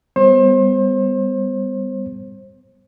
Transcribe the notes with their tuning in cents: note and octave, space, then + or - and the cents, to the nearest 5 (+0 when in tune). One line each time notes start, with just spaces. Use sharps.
G3 +15 B3 +30 C5 +35